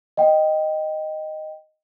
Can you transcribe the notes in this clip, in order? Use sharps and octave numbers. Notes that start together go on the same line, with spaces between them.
D#5 G5